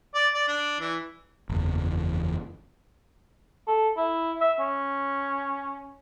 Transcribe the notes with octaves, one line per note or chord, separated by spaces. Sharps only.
D5
D5
D4
E3
F#1 E2 E3
A4
E4
E5
C#4